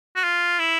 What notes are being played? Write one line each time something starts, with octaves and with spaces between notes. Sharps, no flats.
F#4
F4
E4